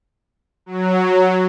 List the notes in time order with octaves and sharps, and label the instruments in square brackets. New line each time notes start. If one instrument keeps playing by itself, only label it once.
[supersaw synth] F#3